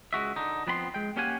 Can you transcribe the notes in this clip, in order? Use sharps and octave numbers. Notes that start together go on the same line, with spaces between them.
C#2 G#3 F#4 E5
D3 D#4
F3 B3 C4 B5 C6
G#3 G5
A#3 C#4 G4 F5 F#5 G#5